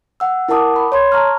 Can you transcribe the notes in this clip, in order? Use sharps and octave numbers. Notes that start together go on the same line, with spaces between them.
F#5 E6
E4 A#4 F#5 A5 D6 D#6
B5
C#5 C6 G#6
A5 A#5 C#6 F6